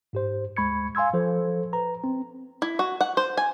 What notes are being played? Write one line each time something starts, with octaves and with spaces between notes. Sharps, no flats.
G#2 G4 C5
D2 G#3 B5 C#6 G#6 C#7
F5 G#5 C6 E6 G#6
F3 A4 C5
B4 A#5
C4
E4
F#4
F#5
C5
G#5